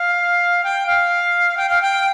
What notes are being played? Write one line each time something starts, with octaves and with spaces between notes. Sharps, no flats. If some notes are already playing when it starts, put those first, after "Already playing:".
Already playing: F5
G5
F5
G5
F5
G5